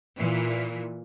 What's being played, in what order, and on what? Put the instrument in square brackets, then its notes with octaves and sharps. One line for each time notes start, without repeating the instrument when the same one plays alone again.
[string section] A#2 E3